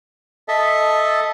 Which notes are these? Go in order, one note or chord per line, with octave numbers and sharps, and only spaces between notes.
A4 D#5 E5